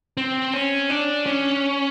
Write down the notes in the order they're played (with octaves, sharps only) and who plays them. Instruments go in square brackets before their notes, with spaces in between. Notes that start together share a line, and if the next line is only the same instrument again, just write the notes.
[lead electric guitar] C4
C#4
D4
C#4